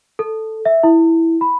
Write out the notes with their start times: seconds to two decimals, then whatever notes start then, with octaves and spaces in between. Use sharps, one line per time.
0.19 A4
0.65 E5
0.83 E4
1.41 B5